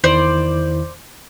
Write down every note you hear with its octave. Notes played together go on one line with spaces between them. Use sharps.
E2 D#3 E4 C5 D5